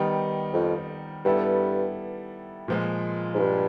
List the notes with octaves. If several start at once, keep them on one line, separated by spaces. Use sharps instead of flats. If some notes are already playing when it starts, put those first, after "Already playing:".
Already playing: D#3 G3 B3 D#4
F2
G2 G3 B3 E4 A4
A#2 F3 G#3
G#2
G2